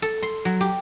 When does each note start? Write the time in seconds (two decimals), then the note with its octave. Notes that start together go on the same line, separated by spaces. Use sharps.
0.02 A4
0.22 C6
0.45 F#3
0.61 G4